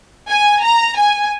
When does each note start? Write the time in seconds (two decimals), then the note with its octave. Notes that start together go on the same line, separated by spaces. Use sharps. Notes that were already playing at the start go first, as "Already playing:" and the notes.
0.29 G#5
0.63 A#5
0.97 G#5